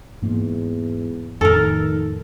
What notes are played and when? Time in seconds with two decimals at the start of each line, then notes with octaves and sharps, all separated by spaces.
0.22 E2 G#2 A#3
1.41 F2 A2 D#3 A4 A#4